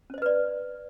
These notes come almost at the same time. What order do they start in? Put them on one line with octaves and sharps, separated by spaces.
C#4 C5 D#5 B4 D5